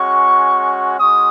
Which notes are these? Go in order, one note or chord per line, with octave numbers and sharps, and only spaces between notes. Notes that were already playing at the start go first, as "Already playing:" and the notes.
Already playing: G#3 C#4 F#4 C#6
G#3 C#4 F#4 D#6